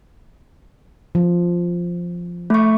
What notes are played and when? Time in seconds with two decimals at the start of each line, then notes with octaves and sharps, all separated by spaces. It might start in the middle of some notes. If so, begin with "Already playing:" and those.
1.15 F3
2.50 A3 C#6